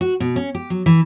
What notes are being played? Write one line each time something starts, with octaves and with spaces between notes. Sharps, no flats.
F#4
B2
C#4
G4
F#3
E3